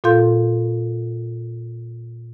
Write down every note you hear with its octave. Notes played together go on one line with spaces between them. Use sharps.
A#2 F4 A4 F5 C6 G6